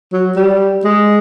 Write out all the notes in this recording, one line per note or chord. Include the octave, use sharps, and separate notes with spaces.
F#3
G3
G#3